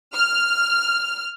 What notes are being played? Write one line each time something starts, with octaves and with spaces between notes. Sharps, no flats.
F6